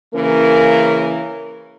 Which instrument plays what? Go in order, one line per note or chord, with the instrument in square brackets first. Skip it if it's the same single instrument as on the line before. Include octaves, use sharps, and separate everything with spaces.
[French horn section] C#3 E3 A#3 C#4 A#4